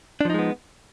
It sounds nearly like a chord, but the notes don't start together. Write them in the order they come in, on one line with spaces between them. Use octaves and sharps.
D4 F3 D#4 G#3 B3